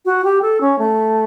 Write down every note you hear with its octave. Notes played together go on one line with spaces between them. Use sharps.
F#4
G4
A4
C#4
A3